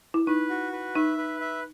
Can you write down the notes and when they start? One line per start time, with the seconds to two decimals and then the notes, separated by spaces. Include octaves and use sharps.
0.14 E4
0.27 D#4 B4
0.49 F#4
0.72 B4
0.95 D#4 E5
1.17 B4
1.40 E5